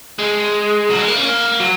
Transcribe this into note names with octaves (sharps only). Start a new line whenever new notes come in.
G#3
F#3
G#3
A#3
C#4
A#3
F#3